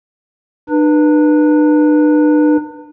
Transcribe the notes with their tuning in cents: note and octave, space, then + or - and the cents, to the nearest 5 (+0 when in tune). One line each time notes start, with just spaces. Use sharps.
D4 +45 B4 -15